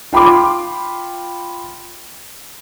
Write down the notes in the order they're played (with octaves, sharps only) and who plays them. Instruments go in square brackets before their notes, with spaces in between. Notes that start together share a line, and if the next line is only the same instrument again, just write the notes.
[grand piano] F4 G5 B5 C6 D6